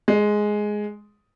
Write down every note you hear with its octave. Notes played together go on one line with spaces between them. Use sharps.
G#3